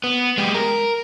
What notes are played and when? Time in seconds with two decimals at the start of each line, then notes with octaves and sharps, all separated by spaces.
0.04 B3
0.38 G#3 G4
0.54 A#4